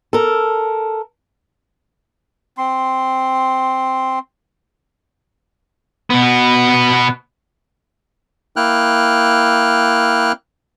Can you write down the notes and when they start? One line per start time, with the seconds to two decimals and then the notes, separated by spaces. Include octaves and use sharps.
0.13 A4 A#4
2.58 C4 C6
6.10 B2 B3
8.56 A#3 E4 G5 F6 F#6